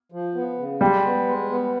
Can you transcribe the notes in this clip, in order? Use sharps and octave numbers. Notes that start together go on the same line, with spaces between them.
F3
B3
C#3
G3 G#3
B3
G#3
B3